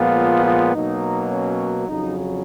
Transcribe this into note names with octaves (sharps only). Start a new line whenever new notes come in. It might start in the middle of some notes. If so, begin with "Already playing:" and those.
Already playing: A#2 F3 G#3 B3 F4
F4
B2 F#3 A#3 D#4
C#4
F2 C#3 F#3 D#4